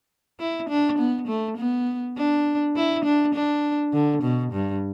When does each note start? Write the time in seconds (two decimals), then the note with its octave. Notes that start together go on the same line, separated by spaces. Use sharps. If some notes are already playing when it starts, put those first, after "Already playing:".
0.40 E4
0.69 D4
0.98 B3
1.28 A3
1.57 B3
2.17 D4
2.76 E4
3.05 D4
3.34 D4
3.93 D3
4.23 B2
4.52 G2